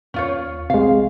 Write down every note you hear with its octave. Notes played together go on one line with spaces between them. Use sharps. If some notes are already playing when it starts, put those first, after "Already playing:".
D#2 C#4 F4 C#5
A#1 C3 G#3 F5